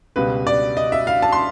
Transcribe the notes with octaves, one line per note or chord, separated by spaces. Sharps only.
C#2 B2 G3 B4
D5
D#5
E5
F5
A5
C6